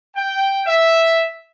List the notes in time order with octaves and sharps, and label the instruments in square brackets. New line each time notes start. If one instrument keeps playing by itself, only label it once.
[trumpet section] G5
E5